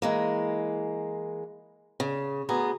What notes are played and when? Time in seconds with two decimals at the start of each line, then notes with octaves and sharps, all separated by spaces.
0.02 E3 G#3 A#3
2.00 C#3
2.49 D2 B3 G#4 A#5